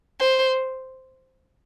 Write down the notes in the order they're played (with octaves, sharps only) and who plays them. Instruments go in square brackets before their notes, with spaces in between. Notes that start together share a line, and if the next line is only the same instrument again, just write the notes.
[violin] C5